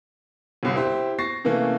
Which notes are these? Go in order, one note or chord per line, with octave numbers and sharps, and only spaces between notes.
G1 C2
E4 G4 C5
C#6 A6 A#6 C7
C3 E3 A3 A#3 C#4